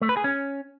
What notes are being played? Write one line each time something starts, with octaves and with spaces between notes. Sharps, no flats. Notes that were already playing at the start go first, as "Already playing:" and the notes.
A3
B4
G#4
C#4